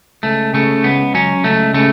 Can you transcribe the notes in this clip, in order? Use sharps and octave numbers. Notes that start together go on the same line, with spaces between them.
C#2 A3
C#3 A3
C#2 B3
F#3 C#4
C#2 A3
C#3 A3